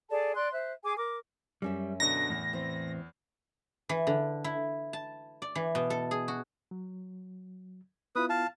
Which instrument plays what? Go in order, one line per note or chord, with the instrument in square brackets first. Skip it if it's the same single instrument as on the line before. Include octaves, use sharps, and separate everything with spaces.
[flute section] G#4 A4 D5 A5
D5 C6 F#6
C5 E5 F#6
G#4 G#5 D6
A#4 D6
[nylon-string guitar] F#2 C#4 E5 [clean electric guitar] G3
[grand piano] B2 D3 [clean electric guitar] A#5 [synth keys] A#6
[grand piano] E2 [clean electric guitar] A2
[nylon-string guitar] E3 C4
[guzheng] E3
D3
E4
A5
D5
E3
B2
A4
G#4
F#4
[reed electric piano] F#3
[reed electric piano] B3 E4 F4 [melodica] B4 D#6
[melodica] F5 A5